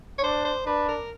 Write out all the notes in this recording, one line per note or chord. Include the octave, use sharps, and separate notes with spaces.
C#5
D4 C5
C5
D4 B4
A#4